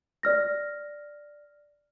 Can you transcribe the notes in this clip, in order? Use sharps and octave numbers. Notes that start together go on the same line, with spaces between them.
D5 F6 A#6